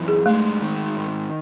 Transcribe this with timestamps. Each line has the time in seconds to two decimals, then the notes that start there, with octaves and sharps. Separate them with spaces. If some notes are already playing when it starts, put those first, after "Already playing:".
Already playing: F#2 E3
0.08 G#4
0.26 G#3 A3
0.62 D#3
0.97 G#2